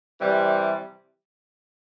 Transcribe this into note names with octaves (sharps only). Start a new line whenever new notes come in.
C3 E3 G3